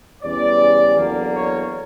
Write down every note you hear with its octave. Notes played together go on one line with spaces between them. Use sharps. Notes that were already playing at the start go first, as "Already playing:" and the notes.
E2 C#3 G3 C#4 D5
E2 D3 F#3 A#3
C#5